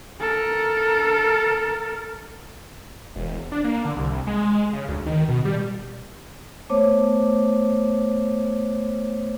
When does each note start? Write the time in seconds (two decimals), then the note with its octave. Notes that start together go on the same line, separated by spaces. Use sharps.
0.20 A4 A#4
3.16 E1
3.52 D4
3.64 A#3
3.85 D3
3.97 C2
4.27 G#3
4.73 C#3
4.88 D2
5.06 D#3
5.28 B2
5.45 G3
6.70 A3 B3 C5 C#5 D6